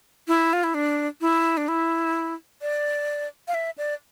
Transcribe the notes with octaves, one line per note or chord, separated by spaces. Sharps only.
E4
F4
E4
D4
E4
D4
E4
D5
F5
E5
D5